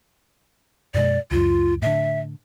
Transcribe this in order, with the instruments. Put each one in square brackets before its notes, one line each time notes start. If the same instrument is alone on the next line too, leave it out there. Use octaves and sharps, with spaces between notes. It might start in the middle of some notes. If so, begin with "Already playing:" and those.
[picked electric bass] F#2 B2 G#3 [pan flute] D5
[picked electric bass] C#2 F#2 [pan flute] F4
[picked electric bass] A2 D3 [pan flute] E5